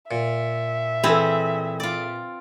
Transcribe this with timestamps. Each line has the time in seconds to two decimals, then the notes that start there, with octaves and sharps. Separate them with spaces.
0.11 A#2 E5
1.03 E3 C4 E4 G#4 A4
1.80 F4 D5